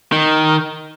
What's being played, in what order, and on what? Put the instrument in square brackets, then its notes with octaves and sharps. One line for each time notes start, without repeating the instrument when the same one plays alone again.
[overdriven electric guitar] D#3